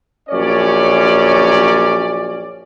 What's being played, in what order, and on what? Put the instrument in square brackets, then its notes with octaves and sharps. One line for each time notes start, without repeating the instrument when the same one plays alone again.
[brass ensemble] A#1 F#2 C#4 C#5 D5